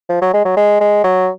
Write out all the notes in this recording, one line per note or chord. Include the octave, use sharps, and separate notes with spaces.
F3
F#3
G#3
F#3
G#3
G#3
F#3